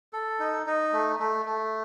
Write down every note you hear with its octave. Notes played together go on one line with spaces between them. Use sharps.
A4
D#4
D#4
A3
A3
A3